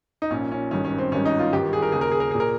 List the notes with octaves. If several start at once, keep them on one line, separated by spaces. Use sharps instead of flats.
D#4
A#1 A#2 C#4
C#4
G#1 G2 D#3 C#4
C#4
C4
G#1 G2 D#3 C#4
D#4
F4
G1 G2 D#3 G4
G#4
A#4
D#2 C#3 G#4
A#4
G#4
A#4
A#2 G#4
A#4